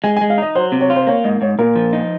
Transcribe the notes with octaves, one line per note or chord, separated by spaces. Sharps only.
G#3 G#5
G#5
G#3
F5
D#4 D#5
F#3 C5
C3
C#5
F4
C5
A#3 C#5
G#2 D#5
G#2 C#5
A#2 A#4
F3
D#4